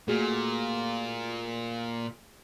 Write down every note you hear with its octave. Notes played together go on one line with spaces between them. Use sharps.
A#2 A3 F#4 G#4